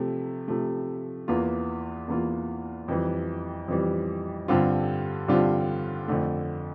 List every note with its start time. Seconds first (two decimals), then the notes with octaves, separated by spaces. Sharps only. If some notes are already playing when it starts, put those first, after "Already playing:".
Already playing: C3 F3 A3
0.48 C3 F3 A3
1.28 E2 E3 A#3 F4
2.08 E2 E3 A#3 F4
2.88 F2 E3 G3
3.68 F2 E3 G3
4.48 G2 D3 G3 C4 F4
5.28 G2 D3 G3 C4 F4
6.08 F2 D3 A3